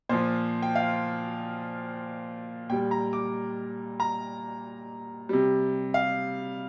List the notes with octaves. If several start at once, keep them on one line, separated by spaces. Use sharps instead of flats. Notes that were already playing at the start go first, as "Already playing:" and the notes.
A#2 F3 C5
G5
F5
A#2 G3 G5
A#5
D6
A#5
C3 G3
F5